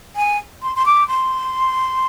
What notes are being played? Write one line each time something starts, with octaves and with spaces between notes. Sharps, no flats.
G#5
C6
C6
D6
C6